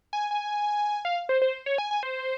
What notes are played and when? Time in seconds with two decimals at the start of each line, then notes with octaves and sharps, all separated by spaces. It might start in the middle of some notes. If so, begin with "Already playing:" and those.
0.13 G#5
0.31 G#5
1.05 F5
1.29 C5
1.42 C5
1.66 C#5
1.78 G#5
1.91 G#5
2.03 C5